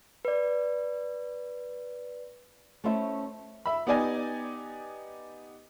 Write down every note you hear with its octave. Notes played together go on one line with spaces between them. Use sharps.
B4 D5
A3 C#4 E4 C5 E5
E5 B5
B3 D#4 G4 D5 D#5 G#5